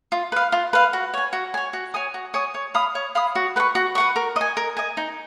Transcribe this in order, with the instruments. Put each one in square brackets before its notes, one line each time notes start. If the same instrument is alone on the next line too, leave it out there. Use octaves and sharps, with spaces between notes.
[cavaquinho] F4
B4 F5
F4
B4 F5
F#4
C#5 G#5
F#4
C#5 G#5
F#4
C#5 G#5 D#6
F#4
C#5 G#5 D#6
C#5
F5 B5 D#6
C#5
F5 B5 D#6
F#4
B4 F#5
C#6
F#4
B4 F#5 C#6
A#4
D#5 G#5
A#4
D#5 G#5
D#4